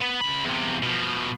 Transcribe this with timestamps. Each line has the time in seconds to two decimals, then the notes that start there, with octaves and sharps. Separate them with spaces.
0.01 B3
0.21 C#2 B5
0.45 E2 C3
0.83 B2 F3